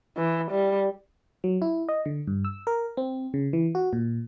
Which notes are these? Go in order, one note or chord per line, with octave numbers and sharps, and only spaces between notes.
E3
G3
F#3
E4
D#5
D3
G2
E6
A#4
C4
C#3
E3
F#4
A#2